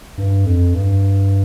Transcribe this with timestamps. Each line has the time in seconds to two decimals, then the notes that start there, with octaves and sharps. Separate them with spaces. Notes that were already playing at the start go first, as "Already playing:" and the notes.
0.18 G2
0.45 F2
0.73 G2